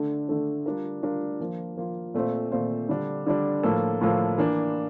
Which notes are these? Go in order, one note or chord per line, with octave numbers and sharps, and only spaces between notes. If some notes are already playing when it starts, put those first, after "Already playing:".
Already playing: D3 A3 D4
D3 A3 D4
G3 D4 F4 A#4
G3 D4 F4 A#4
F3 A#3 F4
F3 A#3 F4
A#2 A3 C4 F4 C5
A#2 A3 C4 F4 C5
D3 G3 D4
D3 G3 D4
A2 F3 A#3 F4 A4
A2 F3 A#3 F4 A4
E3 A#3 D4